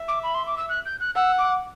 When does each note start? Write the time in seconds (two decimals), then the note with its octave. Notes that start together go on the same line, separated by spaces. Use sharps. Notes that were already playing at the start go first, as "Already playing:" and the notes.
Already playing: E5
0.08 D6
0.23 B5
0.34 C6
0.47 D6
0.57 E6
0.69 F#6
0.85 G6
1.00 F#6
1.15 F#5 E6
1.38 D6